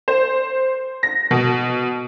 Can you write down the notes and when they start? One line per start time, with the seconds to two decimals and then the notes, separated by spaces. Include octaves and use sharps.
0.08 C5
1.03 A#6
1.31 B2